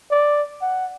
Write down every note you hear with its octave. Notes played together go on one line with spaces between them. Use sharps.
D5
F#5